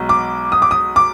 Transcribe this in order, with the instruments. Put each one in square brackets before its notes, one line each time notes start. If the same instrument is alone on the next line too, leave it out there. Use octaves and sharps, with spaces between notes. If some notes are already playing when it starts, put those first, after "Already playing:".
Already playing: [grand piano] B1 B2 G#3
[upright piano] D6
D#6
D6
D#6
D6